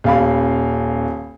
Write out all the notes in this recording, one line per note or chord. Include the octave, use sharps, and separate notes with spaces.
D#1 F5 B5